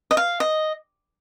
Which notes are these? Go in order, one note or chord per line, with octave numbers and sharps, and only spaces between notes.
D#5
F5
D#5